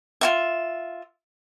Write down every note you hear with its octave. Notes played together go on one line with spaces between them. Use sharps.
F4 F#4 E5